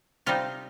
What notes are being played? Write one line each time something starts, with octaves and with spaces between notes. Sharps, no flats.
C3 G3 C4 D#4 F4